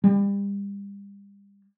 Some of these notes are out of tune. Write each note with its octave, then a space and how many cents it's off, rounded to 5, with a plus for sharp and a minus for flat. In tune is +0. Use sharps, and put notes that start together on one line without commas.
G3 +35